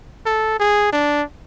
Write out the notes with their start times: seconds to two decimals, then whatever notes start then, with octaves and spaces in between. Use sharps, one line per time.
0.26 A4
0.59 G#4
0.93 D4